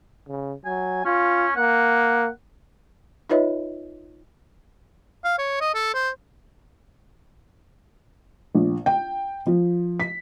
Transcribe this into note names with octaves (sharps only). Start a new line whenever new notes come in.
C#3
F#3 G#5
C#4 F4
A#3 F#5
D#4 F4 B4 C#5 D#5 E5
F5
C#5
D#5
A4
C5
A#1
G5
F3
B6